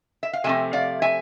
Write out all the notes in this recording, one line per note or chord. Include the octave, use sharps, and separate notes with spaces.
E5
F5
C3 F3 A3 C4 E5 G#5
D5 F5
E5 G#5